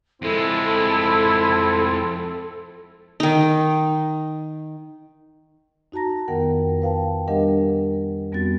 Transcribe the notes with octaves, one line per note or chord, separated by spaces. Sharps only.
F2 G#3 C4 E4 A4
D#3 D#4
D#4 F#4 A5 A#5 A#6
F2 D#3 B3 A#4 F#5 G5
B4 F5 G5 A5
G3 D4 G4 A#4 D#5 F#5
F2 G3 B3 C4 F#4 A6